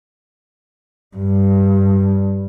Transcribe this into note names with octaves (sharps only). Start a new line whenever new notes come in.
G2